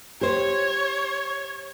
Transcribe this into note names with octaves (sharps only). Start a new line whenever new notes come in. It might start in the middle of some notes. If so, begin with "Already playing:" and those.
G4 C5 C#5